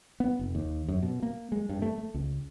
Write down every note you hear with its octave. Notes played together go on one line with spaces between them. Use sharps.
B3
F1
D#2
F#2
B2
A#3
G#3
G2
A3
A3
C#2